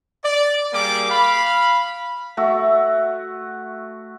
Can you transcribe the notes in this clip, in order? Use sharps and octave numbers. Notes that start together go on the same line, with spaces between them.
D5
G3 A#3 G4 G#4 D6
F5 B5
A3 F#4 E5